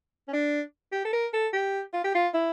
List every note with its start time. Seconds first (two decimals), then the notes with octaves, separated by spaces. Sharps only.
0.28 C#4
0.33 D4
0.92 G4
1.05 A4
1.13 A#4
1.33 A4
1.53 G4
1.93 F4
2.04 G4
2.15 F4
2.34 E4